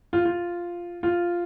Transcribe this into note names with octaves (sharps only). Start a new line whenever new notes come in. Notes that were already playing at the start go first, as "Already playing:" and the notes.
F4
F4
F4